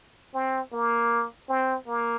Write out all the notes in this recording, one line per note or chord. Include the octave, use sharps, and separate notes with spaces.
C4
A#3
C4
A#3